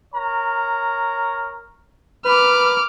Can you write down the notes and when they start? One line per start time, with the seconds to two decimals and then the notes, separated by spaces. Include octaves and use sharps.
0.15 A#4 C#5 A#5
2.25 A#4 B4 B5 D6 F6